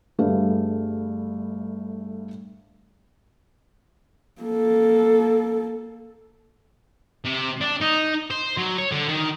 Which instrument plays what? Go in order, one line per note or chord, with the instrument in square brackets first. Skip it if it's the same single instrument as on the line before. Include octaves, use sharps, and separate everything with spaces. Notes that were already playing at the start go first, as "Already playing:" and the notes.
[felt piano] G1 G3 A3 G#4 B4 F5
[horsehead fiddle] A#3 A4
[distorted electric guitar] C3
D4
D#4
C5
F#3
C#5
D3
D#3